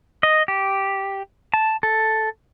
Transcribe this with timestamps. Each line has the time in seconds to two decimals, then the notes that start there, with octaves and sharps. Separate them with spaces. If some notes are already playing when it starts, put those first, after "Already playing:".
0.23 D#5
0.48 G4
1.54 A5
1.83 A4